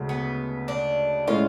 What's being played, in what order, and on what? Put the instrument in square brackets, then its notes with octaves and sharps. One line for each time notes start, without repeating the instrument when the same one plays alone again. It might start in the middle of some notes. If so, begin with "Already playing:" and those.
Already playing: [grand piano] D2 C#3 G#3
[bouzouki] B3
D4
[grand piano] A2 G#3 C#4 [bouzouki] F4